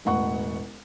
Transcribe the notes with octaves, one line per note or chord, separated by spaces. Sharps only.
E1 A1 F#5 C#6